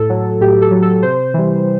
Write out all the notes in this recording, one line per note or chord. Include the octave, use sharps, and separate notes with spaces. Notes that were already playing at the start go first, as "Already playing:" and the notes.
Already playing: A2 A4
F#3
A2 G4
A4
F#3
A4
C3 C5
E3 G3